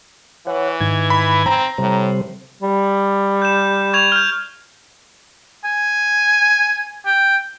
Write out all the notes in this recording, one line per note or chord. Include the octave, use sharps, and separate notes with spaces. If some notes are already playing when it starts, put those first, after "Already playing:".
E3 C#5 F#5
G#2 D#3 G#6
B5
C4 A#5
A2 C3 G3 C5
G3
G6 E7
C#6 G#6 F7
F6 G6
G#5
G5